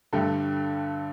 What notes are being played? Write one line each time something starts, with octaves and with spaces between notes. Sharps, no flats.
G2 D3 G3 A3 A4